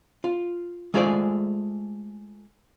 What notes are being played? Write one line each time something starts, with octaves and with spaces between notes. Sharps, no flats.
F4
G#3 A3 F4 G#4 C5 D5